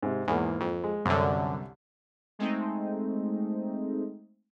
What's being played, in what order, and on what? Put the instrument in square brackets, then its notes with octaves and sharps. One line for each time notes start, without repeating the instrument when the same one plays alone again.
[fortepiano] G#2 C3
[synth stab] E2 [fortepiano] G#2 A#3
[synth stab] F2
[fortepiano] G#3
[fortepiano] C2 [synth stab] F#2 D3
[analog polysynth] G#3 A3 C4 D#4